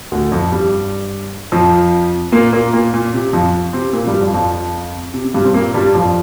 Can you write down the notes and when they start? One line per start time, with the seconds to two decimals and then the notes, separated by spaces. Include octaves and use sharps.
0.12 D2 D3
0.32 F2 F3
0.51 G2 G3
1.52 F2 F3
2.32 A#2 A#3
2.53 A#2 A#3
2.73 A#2 A#3
2.94 A#2
3.14 C3
3.33 F2 F3
3.73 C3 C4
3.93 A#2 A#3
4.07 G2 G3
4.20 F2 F3
4.34 F2 F3
5.14 C3
5.25 C3
5.34 G2 G3
5.45 C3 C4
5.54 A#2 A#3
5.74 G2 G3
5.94 F2 F3